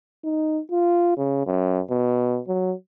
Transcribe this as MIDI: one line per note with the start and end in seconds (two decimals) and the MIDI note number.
0.24 0.60 63
0.71 1.16 65
1.17 1.44 49
1.46 1.81 42
1.90 2.40 47
2.47 2.73 54